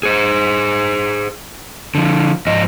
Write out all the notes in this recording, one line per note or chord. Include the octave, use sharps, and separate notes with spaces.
G#4 C5
D3 F3
G#2 F3 D#5